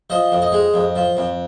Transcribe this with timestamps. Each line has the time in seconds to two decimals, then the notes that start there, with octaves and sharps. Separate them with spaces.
0.10 F3 D#5
0.32 F2
0.42 D#5
0.52 G#3
0.74 F2
0.96 F3
1.17 F2